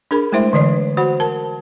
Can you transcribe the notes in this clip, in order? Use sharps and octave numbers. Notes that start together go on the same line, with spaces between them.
D4 G#4 A#4 B5
G#3 A3 E4 C5 E5 C6
D3 E3 C#5 D5
F#4 C5 F#5 B5
A#4 A5